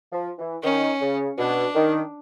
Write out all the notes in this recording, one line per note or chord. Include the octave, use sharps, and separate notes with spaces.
F3
E3
D#3 C#4
C#3
B2 D4
D#3